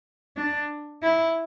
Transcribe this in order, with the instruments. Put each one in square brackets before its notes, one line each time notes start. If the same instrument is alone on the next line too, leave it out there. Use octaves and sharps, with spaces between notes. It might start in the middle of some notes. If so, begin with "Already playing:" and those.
[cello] D4
E4